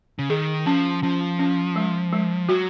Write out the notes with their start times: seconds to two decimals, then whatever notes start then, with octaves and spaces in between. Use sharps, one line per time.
0.19 C#3
0.30 D#3 G#4
0.66 F3 C#4
1.03 F3 C#4
1.39 C#4
1.76 G#3
2.13 G#3
2.49 F#3 F#4